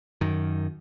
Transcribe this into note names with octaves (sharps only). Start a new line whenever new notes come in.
F#2 D#3